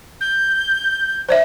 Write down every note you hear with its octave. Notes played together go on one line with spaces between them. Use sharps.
G6
C5 D5 E5